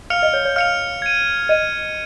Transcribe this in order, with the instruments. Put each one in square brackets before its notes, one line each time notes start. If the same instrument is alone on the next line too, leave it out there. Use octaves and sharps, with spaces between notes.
[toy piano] F5 [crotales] F6 C#7 F7
[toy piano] D#5
C#5
C#5
[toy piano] F5 [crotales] F6 C#7 F7
[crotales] G#6 D#7
[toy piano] D#5 [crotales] G#6 D#7